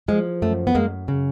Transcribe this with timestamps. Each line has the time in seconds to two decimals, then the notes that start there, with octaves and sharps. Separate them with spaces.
0.08 F3 G#3
0.42 F#2 A3
0.67 B3
0.75 F#2 G#3 A#3
1.08 C#3